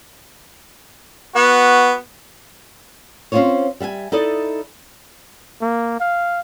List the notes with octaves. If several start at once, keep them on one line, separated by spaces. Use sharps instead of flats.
B3 F#4
C4 C#4 D#4 F4 C5 C#5
G3 E5 F5 G#5
D#4 E4 A4 D5 D#5
A#3
F5